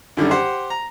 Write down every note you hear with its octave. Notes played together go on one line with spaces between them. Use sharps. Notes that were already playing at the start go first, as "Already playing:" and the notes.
F#2 D3 D#3 G3
G4 C5 F#5
A#5